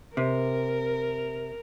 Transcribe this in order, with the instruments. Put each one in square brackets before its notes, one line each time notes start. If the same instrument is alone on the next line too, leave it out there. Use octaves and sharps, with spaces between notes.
[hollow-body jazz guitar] C3 [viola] A#4